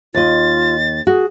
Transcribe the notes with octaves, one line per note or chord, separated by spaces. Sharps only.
D#2 F4 D#5 A6
F#4 G#4